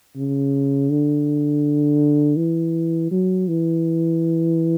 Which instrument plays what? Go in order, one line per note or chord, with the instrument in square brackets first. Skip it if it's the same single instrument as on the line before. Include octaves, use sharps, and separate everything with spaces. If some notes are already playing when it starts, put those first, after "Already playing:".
[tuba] C#3
D3
E3
F#3
E3